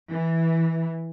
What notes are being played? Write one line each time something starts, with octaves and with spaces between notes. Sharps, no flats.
E3